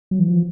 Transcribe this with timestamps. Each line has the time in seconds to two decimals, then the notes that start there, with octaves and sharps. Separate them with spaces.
0.11 F#3
0.19 E3
0.28 F3